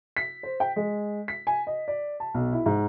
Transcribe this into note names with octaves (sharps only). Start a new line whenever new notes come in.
B6
C5
G5
G#3
B6
G#5
D#5
D5
A5
B1
E4
G#2